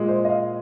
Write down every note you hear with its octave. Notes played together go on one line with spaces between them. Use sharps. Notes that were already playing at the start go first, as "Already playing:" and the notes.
Already playing: A#2 G#3
C5
D#5
F5